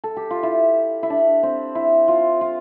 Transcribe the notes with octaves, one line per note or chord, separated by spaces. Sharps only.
A4
G4
F4
E4
E4
D4
C4
E4
F4
F4